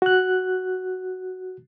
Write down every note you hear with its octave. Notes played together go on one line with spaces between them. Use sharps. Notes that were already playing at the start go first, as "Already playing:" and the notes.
F#4 F#6